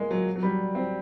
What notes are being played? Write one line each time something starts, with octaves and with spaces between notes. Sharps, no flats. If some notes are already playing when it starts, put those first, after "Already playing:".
Already playing: G#3 A#3
F#3
F#3
G3
C4